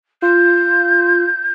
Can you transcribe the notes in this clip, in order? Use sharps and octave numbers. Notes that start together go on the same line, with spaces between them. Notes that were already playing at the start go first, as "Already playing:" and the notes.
F4 G6